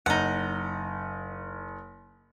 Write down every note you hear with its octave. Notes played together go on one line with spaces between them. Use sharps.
F#1 D#4 F#5